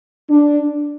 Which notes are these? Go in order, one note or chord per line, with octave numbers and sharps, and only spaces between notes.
D4